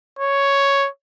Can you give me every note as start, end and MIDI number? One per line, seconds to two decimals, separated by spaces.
0.19 0.87 73